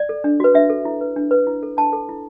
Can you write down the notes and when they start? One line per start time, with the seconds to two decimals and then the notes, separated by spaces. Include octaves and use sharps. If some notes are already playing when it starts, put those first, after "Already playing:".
Already playing: D5
0.09 A4
0.24 D4
0.40 F#4 B4
0.54 D4 E5
0.70 A4
0.85 E4
1.01 B4
1.16 D4
1.31 B4
1.47 E4
1.63 A4
1.77 D4 A5
1.93 A4
2.09 E4